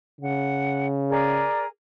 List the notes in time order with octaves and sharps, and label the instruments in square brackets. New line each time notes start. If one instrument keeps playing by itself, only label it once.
[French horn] C#3 [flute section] F#5
[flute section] G#4 A#4 D5